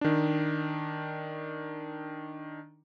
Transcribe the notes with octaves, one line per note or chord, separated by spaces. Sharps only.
D#3 D4